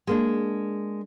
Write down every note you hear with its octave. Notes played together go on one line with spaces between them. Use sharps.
G#3 A#3 D4